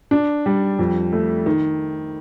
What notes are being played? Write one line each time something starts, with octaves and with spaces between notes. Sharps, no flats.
D4
G3
F2
A3
D#3